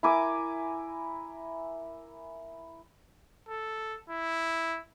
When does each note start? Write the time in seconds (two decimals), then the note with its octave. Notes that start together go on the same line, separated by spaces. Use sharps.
0.03 E4 A#4 G#5 D6
3.49 A4
4.10 E4